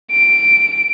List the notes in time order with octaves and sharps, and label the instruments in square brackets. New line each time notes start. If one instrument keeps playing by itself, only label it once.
[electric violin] D7